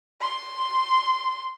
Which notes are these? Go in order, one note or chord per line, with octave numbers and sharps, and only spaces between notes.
C6